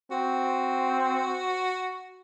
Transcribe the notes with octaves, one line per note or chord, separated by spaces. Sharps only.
C4 F#4